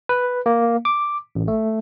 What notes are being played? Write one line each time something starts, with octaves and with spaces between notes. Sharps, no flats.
B4
A#3
D6
A1
A3